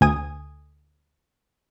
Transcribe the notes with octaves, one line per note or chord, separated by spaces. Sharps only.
D2 G#5 D#6